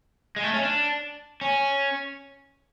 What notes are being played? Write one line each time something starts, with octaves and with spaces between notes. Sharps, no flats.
G#3
A3
C#4
D4
C#4